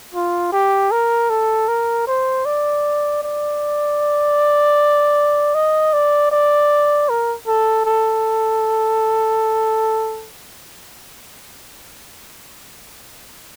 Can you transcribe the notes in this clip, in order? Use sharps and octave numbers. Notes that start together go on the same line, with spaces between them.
F4
G4
A#4
A4
A#4
C5
D5
D5
D#5
D5
D5
A#4
A4
A4